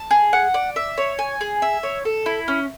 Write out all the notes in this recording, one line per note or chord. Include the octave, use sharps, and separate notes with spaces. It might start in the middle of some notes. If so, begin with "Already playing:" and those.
Already playing: A5
G#4
F#5
D5
E5
C#5
G#5
G#4
E5
C#5
A4
E4
C#4